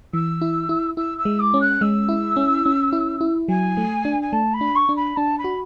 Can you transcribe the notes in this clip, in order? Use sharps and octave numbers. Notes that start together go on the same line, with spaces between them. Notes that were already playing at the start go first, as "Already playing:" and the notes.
E3 E6
E4
E4
E4 E6
E6
G#3
D6
C#4
F#6
G#3 E6
E4
C#4
C#4
E4
E4
F#3 G#5
A3
D4
G#5
A3 A5
B5
D4
C#6
D4
B5
D4 A5
B5
F#4